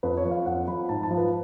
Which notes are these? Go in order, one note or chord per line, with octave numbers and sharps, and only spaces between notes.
F2 B4
C#5
F3
F5
F2 F#5
F3 B5
G#2 A5
A5
F3
B4